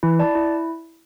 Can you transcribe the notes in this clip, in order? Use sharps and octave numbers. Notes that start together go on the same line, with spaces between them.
E3 E4
D5 A5
E4